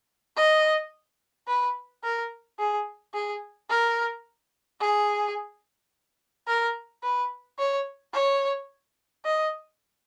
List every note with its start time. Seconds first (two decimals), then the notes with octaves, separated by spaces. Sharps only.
0.37 D#5
1.48 B4
2.04 A#4
2.59 G#4
3.14 G#4
3.70 A#4
4.81 G#4
6.47 A#4
7.03 B4
7.59 C#5
8.14 C#5
9.25 D#5